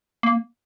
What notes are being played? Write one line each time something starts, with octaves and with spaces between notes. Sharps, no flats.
A#3